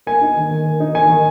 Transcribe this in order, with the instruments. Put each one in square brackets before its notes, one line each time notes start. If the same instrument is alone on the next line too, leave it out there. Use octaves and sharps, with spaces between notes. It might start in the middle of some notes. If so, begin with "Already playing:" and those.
[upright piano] A#3 G#5
D#4
D#3
D#3
A#3
D#4
D#3 G#5
D#3